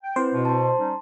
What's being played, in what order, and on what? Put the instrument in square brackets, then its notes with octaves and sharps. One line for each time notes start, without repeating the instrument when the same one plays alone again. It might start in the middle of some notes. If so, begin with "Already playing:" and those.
[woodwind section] G5
[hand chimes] C4 E4 B4 [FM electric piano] C5
[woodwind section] B2
[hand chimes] A5 C6
[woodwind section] G3 C#4 D#4